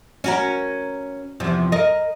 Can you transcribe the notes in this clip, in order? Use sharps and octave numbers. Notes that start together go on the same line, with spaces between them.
C#4 F#4 A#4
E2 C3 F3
A#4 D#5